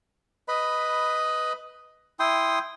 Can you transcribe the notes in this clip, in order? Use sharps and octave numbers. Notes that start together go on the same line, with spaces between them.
B4 D#5 B5
E4 G5 C6 D#6